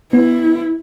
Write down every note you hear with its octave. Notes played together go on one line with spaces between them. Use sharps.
B3 E4